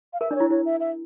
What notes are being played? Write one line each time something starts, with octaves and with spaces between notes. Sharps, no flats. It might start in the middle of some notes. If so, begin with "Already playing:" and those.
F5
A#4 E5
D4 D5
E4 C#5
E4 C#5
E5
E5